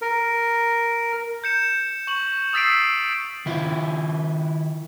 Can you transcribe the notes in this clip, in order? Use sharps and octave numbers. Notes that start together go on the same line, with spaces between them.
A#4
G6 C#7 E7
C#6 F#7
D#6 E6 A6 B6 C7 D7
D#3 E4 F4